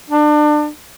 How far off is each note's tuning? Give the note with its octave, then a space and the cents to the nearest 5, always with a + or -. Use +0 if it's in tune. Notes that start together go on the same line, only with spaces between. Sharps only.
D4 +30